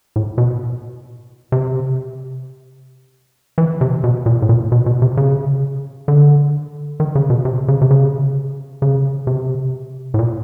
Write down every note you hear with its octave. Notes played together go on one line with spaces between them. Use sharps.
A2
B2
C3
E3
C3
B2
A#2
A2
A#2
B2
B2
C3
C#3
D3
D#3
C#3
B2
C3
C#3
C3
C#3
C#3
C3
A2
A#2